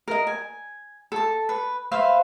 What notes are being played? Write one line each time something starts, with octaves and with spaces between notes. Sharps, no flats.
A#4 D#5
G#5
A4 A5
B4
B4 C5 E5 F5